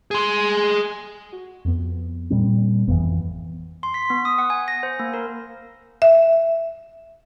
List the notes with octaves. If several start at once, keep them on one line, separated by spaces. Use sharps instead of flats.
G#4 C6
F#4
F2 B3
A#2 G3 C4
G#1 F2 E3 B3
C6
B6
B3
D#6
F#5
G#5
A#6
C5
A#3
A#4
E5